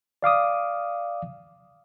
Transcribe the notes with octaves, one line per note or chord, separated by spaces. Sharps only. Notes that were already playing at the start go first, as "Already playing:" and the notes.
D5 F5 D6 D#6